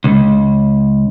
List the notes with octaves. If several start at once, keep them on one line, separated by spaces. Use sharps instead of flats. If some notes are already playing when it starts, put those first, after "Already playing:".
C#2